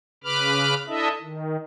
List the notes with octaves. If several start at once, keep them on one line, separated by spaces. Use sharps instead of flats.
C#3 B4 B5 D6 F6
D4 E4 A4 D#5 E5
D#3